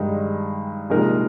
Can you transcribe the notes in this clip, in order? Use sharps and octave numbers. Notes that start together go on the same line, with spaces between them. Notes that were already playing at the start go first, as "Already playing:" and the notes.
Already playing: G2 D#3 G#3 D#4
C2 A#2 G#3 D#4 A#4